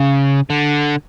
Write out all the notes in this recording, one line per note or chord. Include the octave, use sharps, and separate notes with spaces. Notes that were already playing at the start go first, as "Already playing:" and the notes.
Already playing: C#3
D3